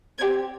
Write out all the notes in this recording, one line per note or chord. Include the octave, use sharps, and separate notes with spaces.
C4 G4 G#6